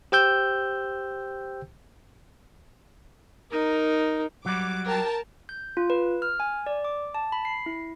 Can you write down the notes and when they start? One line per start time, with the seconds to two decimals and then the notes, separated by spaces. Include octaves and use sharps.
0.12 G4 C5 G5 E6 G6
3.51 D#4 A#4
4.46 F#3 G3 D6
4.85 A#4 G5 A5
5.49 G6
5.77 F4
5.90 B4
6.22 F6
6.40 G#5
6.66 D5
6.84 D6
7.15 A5
7.32 B5
7.45 C7
7.66 E4